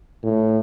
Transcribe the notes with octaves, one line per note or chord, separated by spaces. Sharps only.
A2